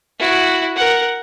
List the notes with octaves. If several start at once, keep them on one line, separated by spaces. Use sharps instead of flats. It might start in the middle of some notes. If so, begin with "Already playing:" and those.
E4 F#4
A#4 F#5